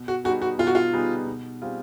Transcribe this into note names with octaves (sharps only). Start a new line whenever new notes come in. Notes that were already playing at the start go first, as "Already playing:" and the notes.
Already playing: B2
F#4
G3 B3 D#4 F#4 G#4
F#4
B2 F4
F#4
F4
G3 B3 D#4 G#4
B2
G3 C4 F4 G#4